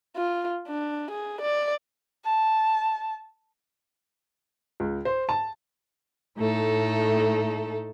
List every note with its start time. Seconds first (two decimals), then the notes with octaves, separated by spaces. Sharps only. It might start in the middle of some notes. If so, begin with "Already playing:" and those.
0.16 F4
0.68 D4
1.11 G#4
1.42 D5
2.25 A5
4.80 C#2
5.05 C5
5.29 A5
6.38 A2 A3 D#4 A4